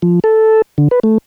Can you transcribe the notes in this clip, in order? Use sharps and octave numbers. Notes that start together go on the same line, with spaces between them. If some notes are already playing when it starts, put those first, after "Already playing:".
F3
A4
D3
B4
A3